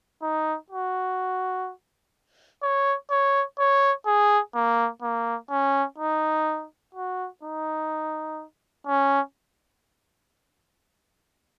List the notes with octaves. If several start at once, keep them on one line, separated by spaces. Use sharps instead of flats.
D#4
F#4
C#5
C#5
C#5
G#4
A#3
A#3
C#4
D#4
F#4
D#4
C#4